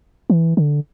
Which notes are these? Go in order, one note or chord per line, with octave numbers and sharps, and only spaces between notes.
E3
D3